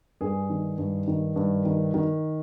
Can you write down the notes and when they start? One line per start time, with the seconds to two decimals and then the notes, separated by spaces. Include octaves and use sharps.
0.21 G2 G#4
0.50 D#3
0.78 G2
1.08 D#3
1.36 G2
1.65 D#3
1.94 D#3